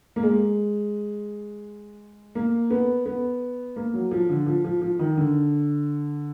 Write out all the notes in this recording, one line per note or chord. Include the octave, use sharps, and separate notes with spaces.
A#3
G#3
A#3
B3
B3
A#3
F#3
F3
D3
F3
F3
F3
D#3
D3